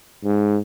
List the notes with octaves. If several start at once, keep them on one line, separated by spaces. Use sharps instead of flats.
G#2